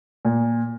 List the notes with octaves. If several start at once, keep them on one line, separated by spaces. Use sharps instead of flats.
A#2